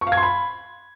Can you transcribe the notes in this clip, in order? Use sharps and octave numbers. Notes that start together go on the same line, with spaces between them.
C#6
F5
G#6
C6
B5